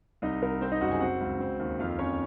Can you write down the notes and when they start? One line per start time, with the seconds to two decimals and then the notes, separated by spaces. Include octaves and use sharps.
0.22 C2 D#4 D#5
0.42 C2 A#4
0.61 C4 C5
0.72 D#4 D#5
0.81 F#1 F#4 F#5
0.91 G#4 G#5
1.01 C4 F#4 F#5
1.21 C#2
1.40 C4
1.59 D#2
1.79 F2 F4 F5
1.99 F2 C#4 C#5